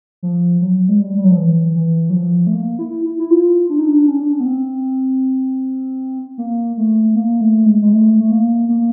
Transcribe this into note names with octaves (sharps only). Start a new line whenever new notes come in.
F3
F#3
G#3
G3
G3
F#3
F3
E3
E3
F#3
F3
A3
A#3
E4
E4
E4
F4
D4
D#4
D4
C#4
D4
C#4
B3
C4
A#3
A3
A#3
A3
G#3
G#3
A3
A3
A#3
A#3